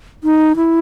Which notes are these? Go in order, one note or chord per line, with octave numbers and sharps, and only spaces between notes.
D#4
E4